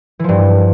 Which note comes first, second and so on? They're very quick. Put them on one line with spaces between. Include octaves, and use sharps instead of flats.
E3 F3 G2